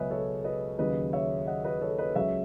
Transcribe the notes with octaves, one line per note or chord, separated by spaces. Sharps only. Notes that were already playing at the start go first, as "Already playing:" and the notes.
Already playing: C#2 B2 F#3 B4 C#5 D#5 E5 G#5
A4 C#5
B4 D#5
D#2 C#3 F#3 B4 D#5
C#5 E5
D#5 F#5
B4 D#5
A4 C#5
B4 D#5
C#2 C#3 F#3 C#5 E5